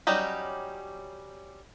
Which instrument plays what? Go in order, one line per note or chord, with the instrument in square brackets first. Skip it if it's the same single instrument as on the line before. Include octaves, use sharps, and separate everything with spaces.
[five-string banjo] F#3 G3 C#4 D#4 G4